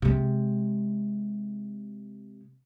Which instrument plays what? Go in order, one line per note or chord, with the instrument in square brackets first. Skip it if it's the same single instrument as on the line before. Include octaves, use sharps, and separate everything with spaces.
[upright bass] C3 G#3